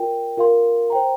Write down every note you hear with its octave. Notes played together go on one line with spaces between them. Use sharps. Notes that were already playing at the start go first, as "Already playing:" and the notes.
Already playing: F4 A#4 G5
F4 A#4 F5 C6
C5 G5 A#5